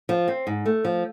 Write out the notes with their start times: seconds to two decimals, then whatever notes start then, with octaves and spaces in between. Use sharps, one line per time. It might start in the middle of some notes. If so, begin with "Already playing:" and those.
0.09 F3
0.28 C4
0.47 G#2
0.66 A3
0.85 F3